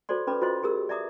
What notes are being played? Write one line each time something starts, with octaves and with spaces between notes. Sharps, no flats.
F#4 A4 C5 D5 C6
C#4 A4 B4 B5 D6
F4 F#4 A4 C5 D#5 C6
G4 G#4 A#4 E6
D5 E5 A#5 D6 D#6